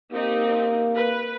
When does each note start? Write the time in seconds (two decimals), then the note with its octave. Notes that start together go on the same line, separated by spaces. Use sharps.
0.13 A#3 C4 D#4 G4
0.95 B4